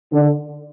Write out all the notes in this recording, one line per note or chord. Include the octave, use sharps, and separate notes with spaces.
D3